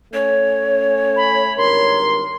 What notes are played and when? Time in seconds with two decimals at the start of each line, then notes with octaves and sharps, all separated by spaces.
0.13 A3 C#4 C#5
1.16 B5
1.57 G#1 G2 A#4 C6